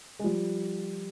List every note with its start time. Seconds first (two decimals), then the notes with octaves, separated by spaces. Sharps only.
0.19 G#3
0.24 F3 G3